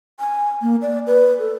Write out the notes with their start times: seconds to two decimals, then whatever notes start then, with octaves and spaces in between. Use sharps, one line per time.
0.20 G#5
0.62 A#3
0.82 D5
1.07 B4
1.39 A4